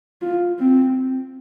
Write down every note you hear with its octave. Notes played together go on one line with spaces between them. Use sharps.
F4
C4